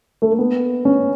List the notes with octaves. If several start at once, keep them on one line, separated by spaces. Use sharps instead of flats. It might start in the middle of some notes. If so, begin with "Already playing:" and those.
A3
A#3
B3
C#4